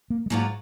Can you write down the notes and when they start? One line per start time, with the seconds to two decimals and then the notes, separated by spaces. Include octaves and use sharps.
0.10 A#3
0.26 G#3
0.30 G#2 F#3 A#3 D4 F4